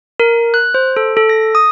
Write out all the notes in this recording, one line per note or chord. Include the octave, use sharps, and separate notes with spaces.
A#4
F#6
C5
A4
A4
A#6
D#6